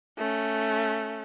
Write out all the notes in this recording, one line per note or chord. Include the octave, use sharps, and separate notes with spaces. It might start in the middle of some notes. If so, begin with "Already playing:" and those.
A3 C#4